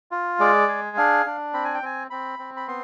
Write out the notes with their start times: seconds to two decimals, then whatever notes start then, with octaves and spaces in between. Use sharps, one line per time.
0.11 F4
0.39 G#3 D5
0.68 G#4
0.97 D4 F5
1.26 D4
1.53 C4 B5
1.64 G#5
1.74 G5
1.82 C4 G#5
2.10 C4 B5
2.39 C4
2.56 B5
2.68 B3 C6